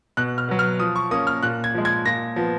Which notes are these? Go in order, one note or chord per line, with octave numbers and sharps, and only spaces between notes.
B2 F#6
F6
F#3 B3
F6
F3 D#6
C#6
A#3 C#4 D#6
F6
A#2 F#6
G#6
F3 G#3
G#6
A#2 A#6
F3 B3